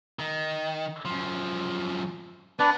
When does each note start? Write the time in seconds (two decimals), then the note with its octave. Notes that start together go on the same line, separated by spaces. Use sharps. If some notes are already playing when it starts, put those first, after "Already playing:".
0.19 D#3
1.05 F#2 F3
2.59 B3 D4 B4 D5